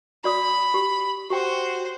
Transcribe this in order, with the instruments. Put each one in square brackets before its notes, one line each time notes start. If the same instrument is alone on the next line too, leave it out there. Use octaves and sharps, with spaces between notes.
[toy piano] F#4 D5 D#6 [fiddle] B5
[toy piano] G4
[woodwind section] F#4 [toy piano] G4 G5 [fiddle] C5